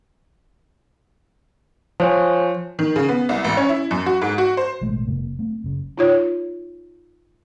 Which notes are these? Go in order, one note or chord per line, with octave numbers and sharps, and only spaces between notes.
F3 C5 C#5 G#5
D#3
C#3
B3
C2
A1
C#4
E4
F#2
F#4
G#2
F#4
C5
A1 B2 G#3 A3
F1 C3 A#3
A3 C4
F#1 C#3
D#4 F4 C#5